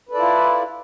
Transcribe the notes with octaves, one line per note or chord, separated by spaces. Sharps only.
E4 F4 A4 B4 D5